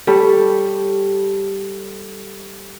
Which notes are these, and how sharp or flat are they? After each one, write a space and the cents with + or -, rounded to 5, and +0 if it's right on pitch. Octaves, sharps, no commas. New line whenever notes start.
G3 +0 A4 +0 C#5 +0